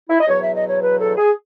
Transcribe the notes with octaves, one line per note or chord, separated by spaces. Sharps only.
E4
D#5
E2 B2 F#3 C#5
E5
D#5
C#5
B4
A4
G#4